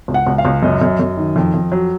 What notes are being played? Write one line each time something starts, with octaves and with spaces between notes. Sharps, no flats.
C#2
F#5
C#2
F5
C#2
F#2 D#5
F#2
F#2
D#3
F2
F2
F#3